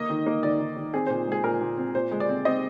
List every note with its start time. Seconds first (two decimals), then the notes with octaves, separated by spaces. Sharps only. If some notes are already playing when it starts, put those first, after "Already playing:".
Already playing: A#3 D#5
0.10 D#3
0.26 A#3
0.43 D#3 D5
0.60 D#3
0.76 D#3
0.93 C4 G#4
1.07 A#2 C5
1.27 G#3 G#4
1.44 A#2 A#4
1.61 A#2
1.77 C4
1.95 A#2 C5
2.11 G#3
2.20 D5
2.29 C4
2.45 C4 D#5